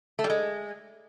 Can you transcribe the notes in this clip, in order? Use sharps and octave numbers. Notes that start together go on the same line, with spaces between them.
A3
G3
G#3